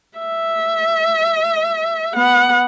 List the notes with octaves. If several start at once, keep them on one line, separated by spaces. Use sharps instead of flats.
E5
B3 F#5